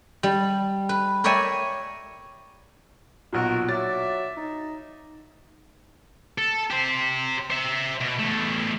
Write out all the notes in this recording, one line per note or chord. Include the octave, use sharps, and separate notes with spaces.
G3
B4
A#4 C#5 D5 E5 G5 G#5
B1 A#2 F#4 A#4
F#3 D5 E5 A6
D#4
A4
G4 C5
C5 E5
B2
E2 A3